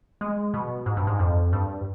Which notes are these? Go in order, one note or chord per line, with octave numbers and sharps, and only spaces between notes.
G#3
B2
G#2
G2
G#2
F2
G2